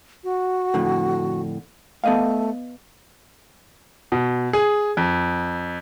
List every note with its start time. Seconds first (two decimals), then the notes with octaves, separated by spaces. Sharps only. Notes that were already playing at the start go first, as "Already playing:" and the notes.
0.24 F#4
0.74 F2 A2 D3
2.04 A3 B3 D#5 F5
4.12 B2
4.53 G#4
4.97 F2